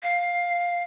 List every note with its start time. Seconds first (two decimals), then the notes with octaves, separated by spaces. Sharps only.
0.03 F5